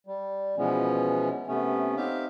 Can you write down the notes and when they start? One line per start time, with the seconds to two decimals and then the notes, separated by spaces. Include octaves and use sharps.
0.07 G3
0.57 B2 E3 F3 G#3 B3 C#4
1.47 C3 A3 B3 C#4
1.97 C4 D#4 G4 E5 F5